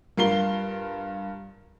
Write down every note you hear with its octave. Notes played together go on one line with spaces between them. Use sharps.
G2 F4 A#4 C7 G7